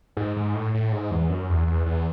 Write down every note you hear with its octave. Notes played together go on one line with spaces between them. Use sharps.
G#2
G#2
A2
A2
G#2
E2
F#2
E2
E2
E2